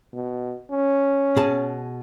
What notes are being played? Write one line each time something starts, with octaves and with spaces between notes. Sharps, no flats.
B2
C#4
B2 G#4 A5